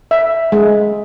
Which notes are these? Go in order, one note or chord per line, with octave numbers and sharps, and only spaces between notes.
E5
G#3